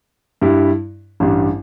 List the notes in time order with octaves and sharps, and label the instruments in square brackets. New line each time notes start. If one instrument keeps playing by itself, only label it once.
[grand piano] G2 G3 E4
A1 G2 G3